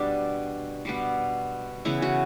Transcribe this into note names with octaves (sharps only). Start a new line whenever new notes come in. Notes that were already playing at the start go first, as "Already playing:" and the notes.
Already playing: B2 G3 B3 D4
B2 G3 B3
C#3 E3 B3 E4
F#4